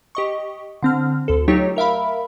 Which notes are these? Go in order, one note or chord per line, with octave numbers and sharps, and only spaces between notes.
G4 D#5 C#6
D3 C4 F6
D2 A4
F#3 A3 D#4 F4 G4 C#5
A#4 E5 F5 B5